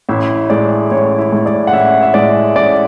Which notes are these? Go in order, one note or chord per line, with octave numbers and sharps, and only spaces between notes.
A1 E4 E5
A2 G#3 D5
A1 C#5
E4 E5
A2 G#3
D5
F#5
A1 E4 E5
E5
A2 G#3 D5
A1 D5